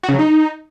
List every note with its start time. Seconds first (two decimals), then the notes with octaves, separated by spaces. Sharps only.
0.03 F#4
0.09 C#3
0.14 F#3
0.19 D#4